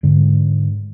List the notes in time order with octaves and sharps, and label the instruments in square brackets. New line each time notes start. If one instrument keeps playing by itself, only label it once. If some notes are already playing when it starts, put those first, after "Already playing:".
[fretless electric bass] G#2 D3